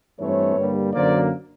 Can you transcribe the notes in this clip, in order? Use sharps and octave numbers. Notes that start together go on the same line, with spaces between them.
G2 E3 A3 C4 B4 C#5
G2 D3 G3 A#3
F#2 D3 F#3 A#3 C5 D5